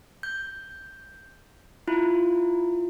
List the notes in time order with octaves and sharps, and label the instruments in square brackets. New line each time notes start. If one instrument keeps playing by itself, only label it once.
[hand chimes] G6
E4 F4